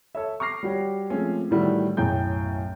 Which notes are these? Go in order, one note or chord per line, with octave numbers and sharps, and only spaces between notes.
A4 C#5 E5
C#6 D6 F6 A#6 C7
G3 F#4 G4 C#5
F3 G#3 A3 C4 C#4
A2 D#3 E3 G3 A3 F#4
B1 F#2 A2 G#4 G5 G6